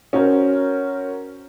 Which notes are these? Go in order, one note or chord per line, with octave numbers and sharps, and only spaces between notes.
C#4 F#4 A#4 C5